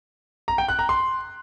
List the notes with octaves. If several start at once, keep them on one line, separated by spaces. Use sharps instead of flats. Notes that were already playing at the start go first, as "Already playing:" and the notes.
A#5
G5
F#6
A#5
C6